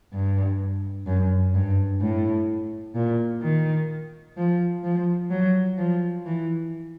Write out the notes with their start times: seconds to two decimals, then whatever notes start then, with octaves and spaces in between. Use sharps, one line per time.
0.13 G2
1.07 F#2
1.54 G2
2.01 A2
2.95 A#2
3.42 D#3
4.37 F3
4.84 F3
5.30 F#3
5.78 F3
6.26 E3